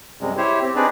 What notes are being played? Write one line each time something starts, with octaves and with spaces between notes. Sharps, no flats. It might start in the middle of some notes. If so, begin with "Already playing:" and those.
F#2 C3 G3 G#3
E4 G4 C5 C#5
C4 G4
C4 D4 D#4 G#4 B4 D5